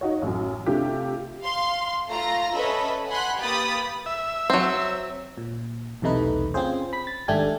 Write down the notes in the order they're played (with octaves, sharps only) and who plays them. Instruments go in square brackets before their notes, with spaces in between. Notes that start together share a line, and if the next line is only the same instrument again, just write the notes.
[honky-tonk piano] D#4 F#4 C#5
A1 F#2
C3 A3 D4 F4 G4
[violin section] F5 C6
A3 F4 A#5 A#6
C#4 A4 B4 D#5 E5 B5
F#5 G#5 B5 C6 F#6
A#3 G4 B4 B5 D#6 A6
[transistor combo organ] E5
[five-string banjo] F#3 C4
[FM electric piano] A#2
B1 E2 C3 A3 D#4 B4
C4 C#4 F4 G#4 C5
B5 B6
A6
G#1 G#2 A3 D4 G4 G#5